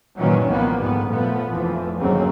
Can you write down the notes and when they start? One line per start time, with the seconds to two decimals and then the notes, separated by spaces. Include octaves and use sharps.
0.18 F#2 A#2 D#3 E3 F#3 C#4
0.47 C2 F3 A#3 B3
0.77 G1 F2 G#2 G3 B3
1.07 A#2 F3 A3 B3
1.48 F1 F2 E3 F3
1.98 G1 D#2 C#3 F#3 A#3 C4